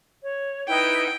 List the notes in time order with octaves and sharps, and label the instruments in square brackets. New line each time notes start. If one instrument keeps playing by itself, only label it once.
[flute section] C#5
[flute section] D#4 E4 B4 [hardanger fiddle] G5